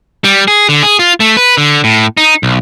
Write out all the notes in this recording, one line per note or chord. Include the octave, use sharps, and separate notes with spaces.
G3
G#4
D3
G#4
F4
A3
B4
D3
A2
D#4
B1